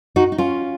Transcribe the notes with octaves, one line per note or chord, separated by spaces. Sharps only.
D#4 F#4
D#4
C#4 F4